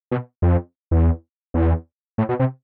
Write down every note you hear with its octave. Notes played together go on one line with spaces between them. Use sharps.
B2
F2
E2
E2
A2
B2
C3